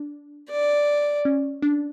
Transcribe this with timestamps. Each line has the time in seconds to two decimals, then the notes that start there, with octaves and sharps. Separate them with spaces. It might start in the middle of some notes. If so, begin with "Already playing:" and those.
Already playing: D4
0.50 D5
1.25 C#4
1.62 D4